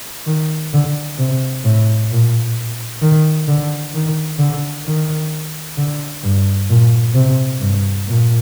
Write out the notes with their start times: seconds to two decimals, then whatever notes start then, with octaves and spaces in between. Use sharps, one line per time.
0.27 D#3
0.74 D3
1.19 C3
1.64 A2
2.11 A#2
3.02 D#3
3.48 D3
3.95 D#3
4.39 D3
4.87 D#3
5.78 D3
6.24 G2
6.70 A#2
7.15 C3
7.60 G2
8.08 A#2